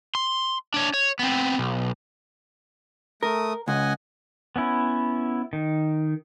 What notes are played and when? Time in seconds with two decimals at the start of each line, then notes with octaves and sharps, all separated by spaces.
0.15 C6
0.74 D4 C#5
0.94 C#5
1.19 B3 C4
1.58 B1
3.23 A3 A#4 D#6
3.68 C#2 D#5 F#5 G#5
4.56 B3 C#4 E4
5.53 D#3